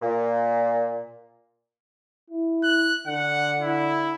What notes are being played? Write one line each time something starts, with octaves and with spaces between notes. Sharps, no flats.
A#2
E4
F#6
D3 F#5
E4